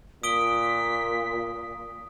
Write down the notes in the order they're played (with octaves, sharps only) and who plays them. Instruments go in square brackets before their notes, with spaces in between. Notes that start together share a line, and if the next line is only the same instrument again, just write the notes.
[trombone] A#2 [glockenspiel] D#6 D7 G7 [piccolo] B6